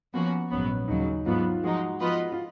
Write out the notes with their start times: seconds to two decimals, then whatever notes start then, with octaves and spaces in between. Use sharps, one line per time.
0.14 F3 A#3 B3 C#4 F#4
0.51 A#1 G#2 F#3 B3 C#4
0.88 D#2 C#3 F#3 D#4
1.26 G#2 F#3 B3 F4
1.63 F3 G#3 D#4 F#4
2.00 F3 B3 F4 B4 D#5
2.32 F4